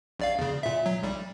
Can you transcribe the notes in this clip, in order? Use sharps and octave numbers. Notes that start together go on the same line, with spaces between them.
A#1 D5 F5
E2 C#3
A#2 E5
F#3
B1 G3